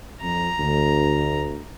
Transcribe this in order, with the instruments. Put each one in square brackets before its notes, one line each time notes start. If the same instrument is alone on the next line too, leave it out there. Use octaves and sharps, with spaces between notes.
[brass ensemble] F2 [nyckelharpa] A#5
[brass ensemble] D2